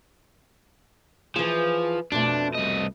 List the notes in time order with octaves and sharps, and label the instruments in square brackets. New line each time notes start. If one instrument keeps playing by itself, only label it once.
[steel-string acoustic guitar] E3 G#4 [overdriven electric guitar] F3
[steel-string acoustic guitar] F2 B2 A3 [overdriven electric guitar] D4
[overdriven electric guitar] C2 D#5